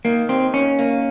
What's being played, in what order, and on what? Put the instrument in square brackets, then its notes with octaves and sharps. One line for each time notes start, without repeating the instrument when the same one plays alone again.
[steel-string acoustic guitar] D#3 [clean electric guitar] A#3
[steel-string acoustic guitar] D#2 [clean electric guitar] C4
[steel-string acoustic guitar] D#2 [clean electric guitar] C#4
[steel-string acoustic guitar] A#3